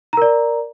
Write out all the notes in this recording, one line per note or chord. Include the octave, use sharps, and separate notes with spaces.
A#4 D5 A#5